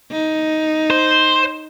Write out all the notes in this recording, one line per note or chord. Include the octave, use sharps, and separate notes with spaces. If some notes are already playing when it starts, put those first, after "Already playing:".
D#4
C5